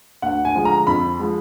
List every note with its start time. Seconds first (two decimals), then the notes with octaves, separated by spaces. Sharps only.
0.22 D2 F#5
0.45 G#5
0.55 D3 F3 G#3
0.65 A#5
0.87 F2 B5
1.19 F3 G#3